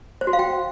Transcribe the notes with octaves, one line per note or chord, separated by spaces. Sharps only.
C5
F#4
F5
G5